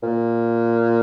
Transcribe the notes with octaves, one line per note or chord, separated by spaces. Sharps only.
A#2